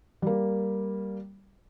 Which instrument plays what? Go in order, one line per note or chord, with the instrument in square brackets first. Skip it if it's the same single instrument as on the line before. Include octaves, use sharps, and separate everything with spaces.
[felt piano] G3 A#3